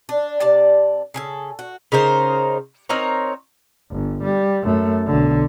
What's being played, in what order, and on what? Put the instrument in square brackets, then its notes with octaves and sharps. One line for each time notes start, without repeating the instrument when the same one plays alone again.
[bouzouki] D4
C3 D5 A5
C#3 G#4 A4
F#4
C#3 D#4 A#4 C5
C4 D#4 A#4 C#5
[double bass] G1
G3
F#2 A3
B1 D3